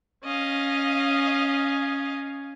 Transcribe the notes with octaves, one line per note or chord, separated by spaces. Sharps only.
C#4 D#5 F5